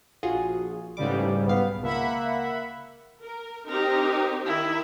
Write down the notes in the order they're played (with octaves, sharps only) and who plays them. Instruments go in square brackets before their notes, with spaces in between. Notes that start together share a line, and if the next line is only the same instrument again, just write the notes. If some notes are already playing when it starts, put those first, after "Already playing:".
[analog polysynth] A#1 [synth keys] F4 F#4 G#4
[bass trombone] A1 [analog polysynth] G#2 C#3 G3 [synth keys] D6
[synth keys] B1 F5 [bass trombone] B3
[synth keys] C#2 [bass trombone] A#3 [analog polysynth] E5 F#5 B5
[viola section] A#4
[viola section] C4 D#4 G4 [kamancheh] A#4
[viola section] D#3 [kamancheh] E4